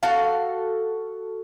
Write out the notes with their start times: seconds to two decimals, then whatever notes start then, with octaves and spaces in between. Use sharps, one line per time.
0.03 F#4 A4 F5